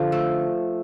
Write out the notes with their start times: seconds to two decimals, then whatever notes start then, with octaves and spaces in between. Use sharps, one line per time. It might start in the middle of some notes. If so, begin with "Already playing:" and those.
Already playing: D3 F3
0.12 A3